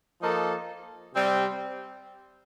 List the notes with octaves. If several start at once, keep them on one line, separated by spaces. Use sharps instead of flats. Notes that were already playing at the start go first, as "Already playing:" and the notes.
F3 A#3 D#4 A4
C3 G3 C4 G4